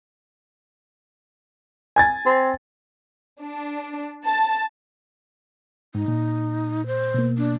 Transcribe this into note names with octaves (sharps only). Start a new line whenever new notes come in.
G#5 G#6 A6
C4
D4
A5
G#2 D#4
A#2
C5
B2 A#3
D4